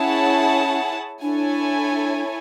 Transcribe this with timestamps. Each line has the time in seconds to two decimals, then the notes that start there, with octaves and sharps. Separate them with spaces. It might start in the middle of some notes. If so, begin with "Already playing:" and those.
Already playing: C#4 E4 G#4 C#5 F#5 A5
1.22 D4 E4 A4 C#5 G#5